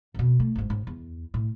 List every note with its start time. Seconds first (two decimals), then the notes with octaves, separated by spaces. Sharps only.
0.14 F2 B2
0.40 A3
0.56 G#1 G#2
0.70 G#2 C#4
0.87 E2
1.34 A2